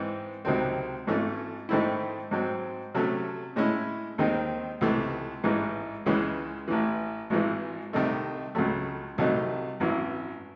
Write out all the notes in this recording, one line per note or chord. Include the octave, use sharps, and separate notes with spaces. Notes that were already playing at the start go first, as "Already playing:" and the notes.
Already playing: G#2 E3 C4
C#2 C3 D#3 F#3 C4
G#1 G#2 E3 A3 C#4
G#2 D#3 A3 C4 E4
G#2 F#3 C4
C3 F#3 A3 C#4
A2 G#3 C#4 E4
D#2 D#3 G#3 C4 D#4
C#2 C3 E3 A3
A1 G#2 E3 G#3
C#2 C#3 E3 G#3 C#4
A1 A2 E3
G#1 G#2 E3 G#3
C2 C3 D#3 A3 D#4
C#2 C#3 F#3 A3
C2 C3 F#3 A3 D#4
G#1 F#2 E3